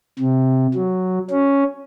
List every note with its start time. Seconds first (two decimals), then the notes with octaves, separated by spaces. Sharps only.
0.19 C3
0.74 F#3
1.30 C#4